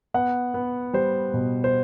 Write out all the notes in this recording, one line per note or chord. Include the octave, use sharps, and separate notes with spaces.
B3 F#5
B3
G3 C5
B2
C5